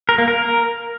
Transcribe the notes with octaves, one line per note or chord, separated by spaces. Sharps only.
A#4
A#3
A#4